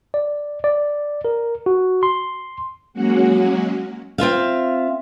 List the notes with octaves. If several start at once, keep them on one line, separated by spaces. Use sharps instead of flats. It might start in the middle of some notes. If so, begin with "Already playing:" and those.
D5
D5
A#4
F#4
C6
F#3 G#3 A#3 C#4 F#4 F#5
C4 F4 E5 F5